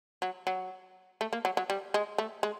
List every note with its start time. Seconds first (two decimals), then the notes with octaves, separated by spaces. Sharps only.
0.22 F#3
0.47 F#3
1.21 A3
1.33 A#3
1.45 F#3
1.57 F#3
1.70 G3
1.94 G#3
2.18 A3
2.43 G#3